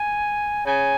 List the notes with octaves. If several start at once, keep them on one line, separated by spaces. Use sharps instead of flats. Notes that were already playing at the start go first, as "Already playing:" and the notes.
Already playing: G#5
C#3 G#5